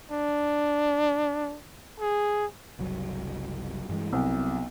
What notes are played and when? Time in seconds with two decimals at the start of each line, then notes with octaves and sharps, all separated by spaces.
0.11 D4
2.00 G#4
2.79 F#1 C2 F#3
3.89 G2 E3 G#3
4.13 C2 F#3 B3